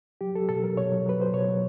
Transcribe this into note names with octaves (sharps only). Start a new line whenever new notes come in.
F#3 G4
F#3 A4
B2 A4
F#3 A#4
B2 C#5
F#3
F#3 B4
F#3 C5
B2 C#5
F#3